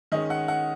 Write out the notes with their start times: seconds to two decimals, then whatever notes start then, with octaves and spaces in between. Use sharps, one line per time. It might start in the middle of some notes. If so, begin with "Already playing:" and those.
0.12 D#3 G#3 C#4 D#5
0.30 F#5
0.48 F#5